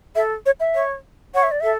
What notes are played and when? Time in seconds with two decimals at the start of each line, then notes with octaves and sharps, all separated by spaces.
0.15 A4 E5
0.46 C#5
0.60 E5
0.75 C#5
1.34 C#5 F#5
1.43 E5
1.51 D5
1.61 A4 E5